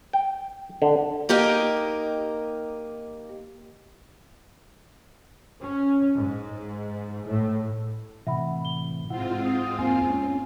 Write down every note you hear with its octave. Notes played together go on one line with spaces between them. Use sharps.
G5
D3
A#3 D#4 G4 A#4 D#5
C#4
G#2
A2
A2 C3 E3 E5 F#5 B5
G7
G#2 C4 E4 F4 F#5
D#6
E2 A#3 G#5 C6
C#4